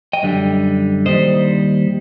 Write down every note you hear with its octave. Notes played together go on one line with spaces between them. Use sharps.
D#5 G5
F#2 D3 G3
D#2 D#3 G3 C5 D#5